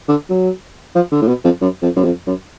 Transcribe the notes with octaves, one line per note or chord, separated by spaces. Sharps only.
D3
F#3
F3
D3
A2
B2
F2
F#2
F2
F#2
F2
F#2